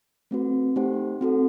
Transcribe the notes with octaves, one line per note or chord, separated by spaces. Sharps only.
A3 C4 F#4 B4
A3 D#4 G4 C5 F#5
C4 F#4 A4